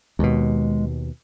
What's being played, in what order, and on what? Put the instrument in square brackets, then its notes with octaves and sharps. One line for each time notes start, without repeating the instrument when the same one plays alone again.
[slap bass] D#2 B2 [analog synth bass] G#3